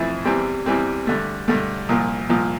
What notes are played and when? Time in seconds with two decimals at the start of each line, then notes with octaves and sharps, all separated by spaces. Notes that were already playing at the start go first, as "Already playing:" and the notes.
Already playing: F2 E3 A3 C4 E4
0.25 E2 E3 G3 C4
0.66 E2 E3 G3 C4
1.07 G2 D3 A3
1.48 G2 D3 A3
1.89 C2 A#2 F3
2.29 C2 A#2 F3